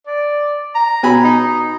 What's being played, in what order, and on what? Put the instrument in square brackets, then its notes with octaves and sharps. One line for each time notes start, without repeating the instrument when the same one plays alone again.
[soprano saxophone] D5
A#5
[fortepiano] B2 G#5 B5
[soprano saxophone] D#4